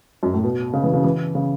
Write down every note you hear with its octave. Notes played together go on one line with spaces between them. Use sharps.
F#2
A2
B2
C#3
E3
C#3
E3
C#3